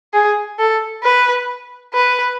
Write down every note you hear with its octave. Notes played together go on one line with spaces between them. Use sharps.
G#4
A4
B4
B4